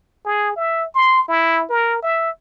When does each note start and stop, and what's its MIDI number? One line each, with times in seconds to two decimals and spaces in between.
0.25 0.56 68
0.56 0.85 76
0.95 1.24 84
1.28 1.64 64
1.70 1.99 70
2.02 2.30 76